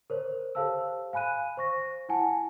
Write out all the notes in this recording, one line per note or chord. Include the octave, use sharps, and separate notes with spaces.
A#4 C5 C#5
G4 A4 C5 F5 A5 E6
F5 G#5 B5 F#6 D#7
C5 C#6 A#6
E4 F#5 G#5 A5